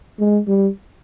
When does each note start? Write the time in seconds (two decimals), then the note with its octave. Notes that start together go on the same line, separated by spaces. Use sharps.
0.20 G#3
0.48 G3